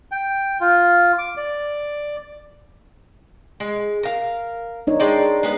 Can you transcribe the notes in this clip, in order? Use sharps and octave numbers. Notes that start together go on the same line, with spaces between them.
G5
F4
D6
D5
G#3
A#4 F5
D4 D#4 C#5
G#3 D5 G5
G#3 B3 B4